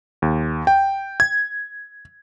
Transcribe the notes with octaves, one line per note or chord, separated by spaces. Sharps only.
D#2
G5
G#6